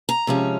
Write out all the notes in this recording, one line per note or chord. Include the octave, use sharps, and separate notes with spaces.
A#5
C3 F3 G#3 C#4